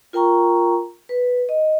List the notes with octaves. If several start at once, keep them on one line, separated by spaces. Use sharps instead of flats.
F4 A#4 G5 A#5 C#6
B4
D#5